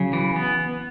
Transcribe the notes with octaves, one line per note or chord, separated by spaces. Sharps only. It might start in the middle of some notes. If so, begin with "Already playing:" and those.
Already playing: C#3 F#3
E3
B3